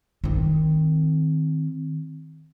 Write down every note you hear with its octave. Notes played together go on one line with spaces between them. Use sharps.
D#3 C4